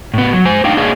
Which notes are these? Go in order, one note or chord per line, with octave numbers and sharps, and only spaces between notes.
A2 B3
F#3
G#3 C5 G#5
A3 D4 D#4 F5 G5
A#3 D4 G#4 C#5 D#5 F5